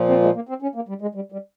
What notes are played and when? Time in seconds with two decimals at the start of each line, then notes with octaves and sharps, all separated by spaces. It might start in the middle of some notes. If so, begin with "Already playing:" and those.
Already playing: A#2 F3
0.09 C4
0.22 G#3
0.35 A#3
0.49 C4
0.62 C#4
0.75 A#3
0.89 G3
1.02 G#3
1.15 G3
1.32 G3